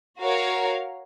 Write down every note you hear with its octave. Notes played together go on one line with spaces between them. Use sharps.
F#4 A#4 C#5 F5